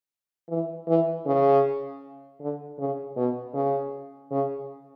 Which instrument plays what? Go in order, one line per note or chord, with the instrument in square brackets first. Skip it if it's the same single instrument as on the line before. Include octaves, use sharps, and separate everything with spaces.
[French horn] E3
E3
C#3
D3
C#3
B2
C#3
C#3